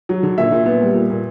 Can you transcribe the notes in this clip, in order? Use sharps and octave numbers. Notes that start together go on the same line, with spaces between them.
F#3
D3
A#2 E5
A#2
B3
G3
A#2
A#2